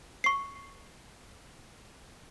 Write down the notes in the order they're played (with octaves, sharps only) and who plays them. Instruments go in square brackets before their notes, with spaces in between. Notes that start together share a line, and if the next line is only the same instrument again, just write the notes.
[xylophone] C#6 C7